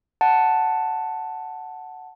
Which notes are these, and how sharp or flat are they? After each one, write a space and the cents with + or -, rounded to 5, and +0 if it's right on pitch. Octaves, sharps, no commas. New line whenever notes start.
F#5 +0 A5 +0